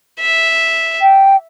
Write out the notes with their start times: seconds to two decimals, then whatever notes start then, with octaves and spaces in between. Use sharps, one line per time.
0.20 E5
1.02 G5